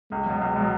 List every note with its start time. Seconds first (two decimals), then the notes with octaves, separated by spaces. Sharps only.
0.11 C#2 G#3
0.26 B2 F#3
0.41 C#2
0.56 B2 F#3